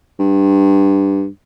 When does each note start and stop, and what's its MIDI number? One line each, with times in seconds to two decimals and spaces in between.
0.20 1.27 43